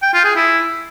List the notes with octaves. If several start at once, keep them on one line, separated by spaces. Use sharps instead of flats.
G5
F4
G#4
E4